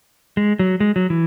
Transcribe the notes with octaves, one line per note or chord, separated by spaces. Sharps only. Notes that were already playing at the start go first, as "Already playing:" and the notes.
G#3
F#3
G#3
F#3
E3